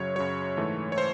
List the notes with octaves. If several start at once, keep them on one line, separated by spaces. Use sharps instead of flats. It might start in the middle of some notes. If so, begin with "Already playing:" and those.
Already playing: F#2 C#3 F#3 C#5
F#2 C#3 F#3 C#5
G#2 E3 A3
C#5
C5